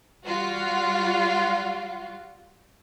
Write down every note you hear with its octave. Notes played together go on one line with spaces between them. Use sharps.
G3 F4 F#4